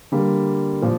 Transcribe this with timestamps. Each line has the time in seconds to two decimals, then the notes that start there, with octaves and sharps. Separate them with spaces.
0.12 D3 G3 A#3
0.82 A#2 F3